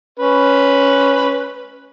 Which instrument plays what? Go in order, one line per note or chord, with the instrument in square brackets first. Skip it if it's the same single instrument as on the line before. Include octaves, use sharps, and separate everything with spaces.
[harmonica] C#4 B4